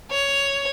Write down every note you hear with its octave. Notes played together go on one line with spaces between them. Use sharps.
C#5